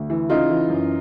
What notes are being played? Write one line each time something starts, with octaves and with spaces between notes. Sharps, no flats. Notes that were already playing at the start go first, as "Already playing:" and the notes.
Already playing: D2
E3
C#3 D#4 F4
E3
F#2